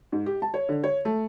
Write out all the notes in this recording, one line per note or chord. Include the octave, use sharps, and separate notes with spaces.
G#2
G4
A5
C#5
D3
C#5
A3